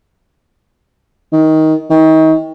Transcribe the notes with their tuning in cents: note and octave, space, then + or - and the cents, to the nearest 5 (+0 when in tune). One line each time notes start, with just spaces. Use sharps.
D#3 +15
D#3 +35